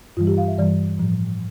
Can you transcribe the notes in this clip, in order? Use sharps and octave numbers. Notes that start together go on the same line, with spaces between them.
G2 E3 G3 F4
G4
F5
E5
G2 E3 G3 D5
A2 F3